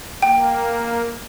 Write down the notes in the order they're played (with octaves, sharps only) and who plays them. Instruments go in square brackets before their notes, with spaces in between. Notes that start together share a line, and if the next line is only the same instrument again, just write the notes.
[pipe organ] A#3 [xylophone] G5